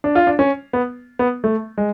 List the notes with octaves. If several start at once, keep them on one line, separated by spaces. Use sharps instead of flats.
D4
F4
D4
C#4
B3
B3
A3
G#3